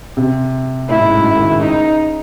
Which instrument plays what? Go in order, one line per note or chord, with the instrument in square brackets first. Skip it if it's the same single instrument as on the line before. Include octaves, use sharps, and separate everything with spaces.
[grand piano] C3
[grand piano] A2 [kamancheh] E4
[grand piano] G#2
F#2
G#2
D#3
C#3
[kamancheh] D#4